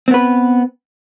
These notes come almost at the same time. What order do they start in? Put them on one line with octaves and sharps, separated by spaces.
C4 B3 B4